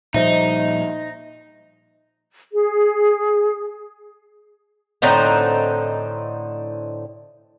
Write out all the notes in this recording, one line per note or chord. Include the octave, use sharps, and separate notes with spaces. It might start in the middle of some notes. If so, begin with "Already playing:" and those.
A#2 F3 G3 D#4 C5 D#5 E5
G#4
A2 D3 C4 D#4